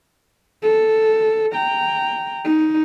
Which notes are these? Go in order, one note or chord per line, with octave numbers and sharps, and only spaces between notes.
A4
G5 A#5
D#4